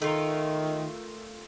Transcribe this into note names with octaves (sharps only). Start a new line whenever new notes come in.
D#3 A3 F4 A#4